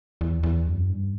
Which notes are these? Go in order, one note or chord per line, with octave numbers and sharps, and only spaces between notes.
E2
E2
F#2
G2